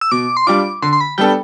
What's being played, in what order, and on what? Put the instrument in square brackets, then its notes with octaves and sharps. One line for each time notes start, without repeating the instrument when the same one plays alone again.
[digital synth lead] E6
[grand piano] B2 [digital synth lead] D6
[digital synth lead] C6
[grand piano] G3 D4 F4 [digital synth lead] D6
[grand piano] D3 [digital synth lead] C6
[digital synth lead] C6
B5
[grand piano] G3 B3 D4 A4 [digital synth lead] G5